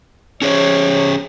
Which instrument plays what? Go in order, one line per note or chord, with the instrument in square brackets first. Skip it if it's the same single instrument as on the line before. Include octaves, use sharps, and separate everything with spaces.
[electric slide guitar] C#4 G#4 C5 [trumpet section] C#5